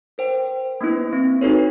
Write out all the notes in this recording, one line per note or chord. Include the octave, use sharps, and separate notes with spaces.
A#4 C5 G5
A#3 B3 D4 E4 B4
C4
D#4 F#4 A4 B4 C#5